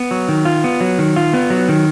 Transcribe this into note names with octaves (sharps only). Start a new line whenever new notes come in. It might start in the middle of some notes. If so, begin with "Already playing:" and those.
Already playing: B3
F#3
D#3
F4
B3
F#3
D#3
F4
B3
F#3
D#3